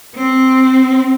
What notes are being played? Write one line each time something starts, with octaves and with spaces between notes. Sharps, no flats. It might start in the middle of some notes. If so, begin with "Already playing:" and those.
C4